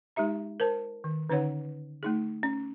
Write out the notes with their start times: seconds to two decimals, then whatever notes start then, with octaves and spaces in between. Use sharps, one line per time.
0.16 G#3 D#4 G4 E5 A#5
0.60 A#4 C5 A5
1.04 D#3
1.29 D3 C#4 D#4 B4 C#5 F#5
2.03 A3 D#4 G#4
2.43 C#4